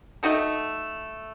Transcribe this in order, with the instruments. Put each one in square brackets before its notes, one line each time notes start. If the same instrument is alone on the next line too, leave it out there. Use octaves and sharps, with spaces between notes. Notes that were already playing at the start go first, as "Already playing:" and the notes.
[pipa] A3 D#4 F#4 A4